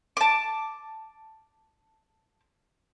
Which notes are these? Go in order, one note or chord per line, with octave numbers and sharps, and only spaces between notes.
A5 D6